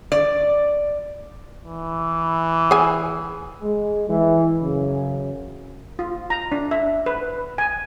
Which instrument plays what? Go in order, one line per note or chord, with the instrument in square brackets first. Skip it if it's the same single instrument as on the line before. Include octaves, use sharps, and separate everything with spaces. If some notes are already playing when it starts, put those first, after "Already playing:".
[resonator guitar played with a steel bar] D5
[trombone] E3
[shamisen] G#4 G#5
[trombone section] G#3
E3
F#2 C#3
[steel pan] F4
A#5
D4
E5
B4
G#5